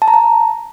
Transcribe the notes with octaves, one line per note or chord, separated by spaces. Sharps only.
A5
A#5
A5